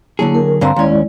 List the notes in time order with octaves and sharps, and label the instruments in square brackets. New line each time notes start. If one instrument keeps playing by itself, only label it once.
[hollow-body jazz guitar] D3 F#3 G#4 [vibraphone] A#3 E4 A5
[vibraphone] A#4
[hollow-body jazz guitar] G2 D3 C4 [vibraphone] F5 A#5 C6
[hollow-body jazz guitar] D#2 C#4 [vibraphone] G#3 E4 D5